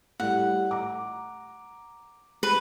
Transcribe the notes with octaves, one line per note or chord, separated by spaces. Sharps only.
A2 G3 F#5
A#5 D6
B4